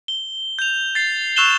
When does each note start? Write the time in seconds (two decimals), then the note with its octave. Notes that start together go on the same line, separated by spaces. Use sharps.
0.08 G7
0.59 G6 F7
0.95 A6 C7
1.36 C#6 E6 F#6 E7 F7 G7